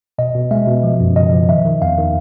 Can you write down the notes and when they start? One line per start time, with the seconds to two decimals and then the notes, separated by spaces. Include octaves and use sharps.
0.18 B2 D#5
0.34 B2
0.51 G#3 E5
0.67 B2
0.83 F3
1.00 F#2
1.16 C#3 D#5
1.32 F3
1.49 D#3 E5
1.65 D#3
1.82 E2 F5
1.98 D#3